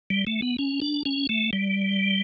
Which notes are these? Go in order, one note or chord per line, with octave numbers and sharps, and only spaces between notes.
G3
A3
B3
C#4
D4
C#4
A3
G3